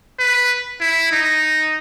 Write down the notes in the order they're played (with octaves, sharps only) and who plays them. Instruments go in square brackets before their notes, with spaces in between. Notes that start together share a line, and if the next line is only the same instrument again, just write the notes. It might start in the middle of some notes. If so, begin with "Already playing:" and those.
[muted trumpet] B4
E4
D#4